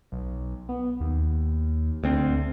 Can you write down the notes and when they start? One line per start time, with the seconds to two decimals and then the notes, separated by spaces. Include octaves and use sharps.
0.12 B1
0.69 B3
1.00 D#2
2.04 D2 C4